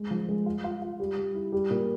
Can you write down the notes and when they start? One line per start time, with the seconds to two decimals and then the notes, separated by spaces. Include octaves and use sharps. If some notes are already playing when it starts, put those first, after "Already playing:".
Already playing: G#3
0.11 F3
0.29 G#3
0.46 F4
0.64 F4
0.82 F4
1.00 G3
1.17 G3
1.35 E4
1.52 G3
1.70 A#2